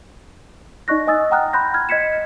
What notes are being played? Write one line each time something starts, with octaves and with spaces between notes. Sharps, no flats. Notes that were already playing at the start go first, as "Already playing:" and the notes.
D#4 D5 D#5 C#6 F#6 A#6
D#5 G#5 D#6 E6 A6
F#5 G5 A#5 D#6 F6 F#6
B5 C6 F#6 G6 A#6
F6 G#6
D#5 G#6 B6 C#7 E7